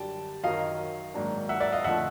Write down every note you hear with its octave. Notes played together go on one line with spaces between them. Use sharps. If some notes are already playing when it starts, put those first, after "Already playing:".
Already playing: F#2 D3 G3 G5 A5
F#2 D#3 F#3 D#5 F5
G#2 D#3 F#3 A#3 D4
E5 F#5
D5 E5
D#5 F5
F2 D3 F3 A3 E5 F#5